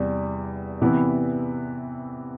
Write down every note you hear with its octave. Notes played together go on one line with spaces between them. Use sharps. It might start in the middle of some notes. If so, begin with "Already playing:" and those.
Already playing: E2 C3 G3
C3 E3 B3 E4 B4